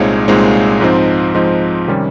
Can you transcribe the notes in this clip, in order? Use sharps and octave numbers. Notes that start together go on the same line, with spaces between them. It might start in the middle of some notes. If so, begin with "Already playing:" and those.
Already playing: C2 A#2 G#3 C4 D#4 C#5 F5
C2 A#2 G#3 C4 D#4
G#2 F3 C4 D#4
G#2 F3 C4 D#4
C3 D#3 G3 C#4